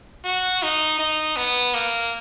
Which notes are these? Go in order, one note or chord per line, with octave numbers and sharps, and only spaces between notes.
F#4
D#4
D#4
B3
A#3